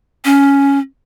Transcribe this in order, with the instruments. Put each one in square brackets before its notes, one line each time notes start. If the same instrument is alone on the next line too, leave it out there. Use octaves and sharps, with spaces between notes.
[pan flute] C#4